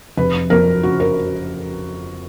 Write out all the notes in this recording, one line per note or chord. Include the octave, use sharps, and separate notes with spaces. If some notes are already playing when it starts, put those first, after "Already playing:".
F1 B4
F2 A#4
C#3 F#4
A#4